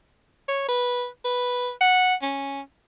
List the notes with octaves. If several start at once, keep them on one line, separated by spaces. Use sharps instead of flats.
C#5
B4
B4
F#5
C#4